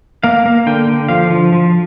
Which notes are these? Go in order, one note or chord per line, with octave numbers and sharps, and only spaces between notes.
A#3 F5
A#3
D3 G5
D3
F3 F5
F3
F3